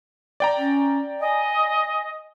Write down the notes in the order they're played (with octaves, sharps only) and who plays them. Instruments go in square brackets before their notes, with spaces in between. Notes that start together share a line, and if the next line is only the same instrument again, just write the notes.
[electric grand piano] D5 G5 A#5
[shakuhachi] C#4
[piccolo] D#5 [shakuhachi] G#5